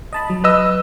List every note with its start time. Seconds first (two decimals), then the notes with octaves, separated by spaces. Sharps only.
0.13 D#5 A5 B5
0.30 F#3
0.44 B4 D#5 E6